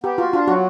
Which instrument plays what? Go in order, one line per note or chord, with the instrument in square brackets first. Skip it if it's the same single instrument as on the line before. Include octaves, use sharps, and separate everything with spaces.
[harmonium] B3 [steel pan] G4
[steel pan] F4 [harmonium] F#4
[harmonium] D4 [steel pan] F4
[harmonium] F#3 [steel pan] F#4